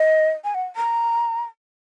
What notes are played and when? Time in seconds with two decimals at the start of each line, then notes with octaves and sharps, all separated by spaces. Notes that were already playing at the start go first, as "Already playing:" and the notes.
Already playing: D#5
0.44 G#5
0.55 F#5
0.76 A#5